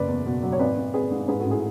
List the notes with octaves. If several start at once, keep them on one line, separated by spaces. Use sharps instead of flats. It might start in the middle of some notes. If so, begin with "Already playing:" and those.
Already playing: F#1 B4 D5
E2
B2
F#3
C#5
G#1 B4 D5
G#1
G#1 G#4 B4
G#2
G#2 G#4 B4
F#4 A4
A1
E4 G#4